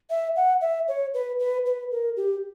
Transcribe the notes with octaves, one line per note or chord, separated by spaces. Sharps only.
E5
F#5
E5
C#5
B4
B4
B4
A#4
G4